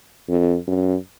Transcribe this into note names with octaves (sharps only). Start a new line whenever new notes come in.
F2
F#2